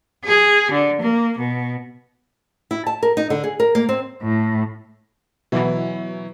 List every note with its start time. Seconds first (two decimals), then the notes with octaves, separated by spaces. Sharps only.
0.25 G#4
0.71 D3
1.01 A#3
1.38 B2
2.71 E4
2.87 A5
3.03 A#4
3.17 D#4
3.30 D3
3.44 G#4
3.60 A#4
3.75 A#3
3.89 C4
4.22 A2
5.52 B2 E3 F#3 E4